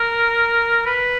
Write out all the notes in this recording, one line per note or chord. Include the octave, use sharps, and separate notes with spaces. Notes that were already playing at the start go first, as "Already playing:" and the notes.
Already playing: A#4
B4